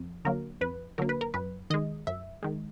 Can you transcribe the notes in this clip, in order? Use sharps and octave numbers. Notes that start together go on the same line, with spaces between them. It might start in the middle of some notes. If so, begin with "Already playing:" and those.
Already playing: F2
D3 F#3 A#3 A#4
F2 B4
D3 F#3 A#3 A#4
B4
A#4
F#2 B4
D#3 G#3 D#5
F#2 E5
D#3 G#3